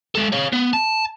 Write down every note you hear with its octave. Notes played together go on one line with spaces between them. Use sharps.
G#3 A4
C#5 F5
B3
A5